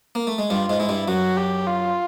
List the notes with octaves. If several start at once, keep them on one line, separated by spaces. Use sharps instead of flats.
A#3
A3
G#3
G2 G3 F4
G#2 G#3
G#3 E4
G2 G3
F#2 F#3 F#4
G4
F4